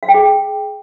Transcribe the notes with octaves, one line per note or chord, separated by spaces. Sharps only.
F5
G5
G#4